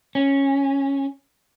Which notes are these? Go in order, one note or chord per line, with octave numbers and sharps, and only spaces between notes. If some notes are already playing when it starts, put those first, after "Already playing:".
C#4